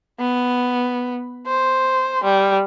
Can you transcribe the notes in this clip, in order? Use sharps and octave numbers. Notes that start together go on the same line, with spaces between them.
B3
C5
G3